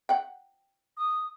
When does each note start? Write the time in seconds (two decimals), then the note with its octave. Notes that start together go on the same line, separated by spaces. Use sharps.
0.09 F#5 G5
0.97 D#6